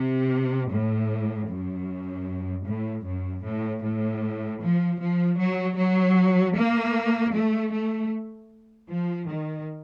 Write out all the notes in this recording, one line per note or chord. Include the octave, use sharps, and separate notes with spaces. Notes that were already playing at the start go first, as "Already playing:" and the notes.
Already playing: C3
A2
F#2
A2
F#2
A2
A2
F3
F3
F#3
F#3
A#3
A3
A3
F3
D#3